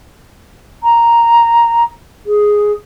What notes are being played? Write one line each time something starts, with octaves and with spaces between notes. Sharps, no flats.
A#5
G#4